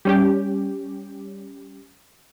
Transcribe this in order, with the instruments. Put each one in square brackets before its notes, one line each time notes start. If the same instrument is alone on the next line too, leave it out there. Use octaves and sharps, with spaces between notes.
[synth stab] G3 C#4 G4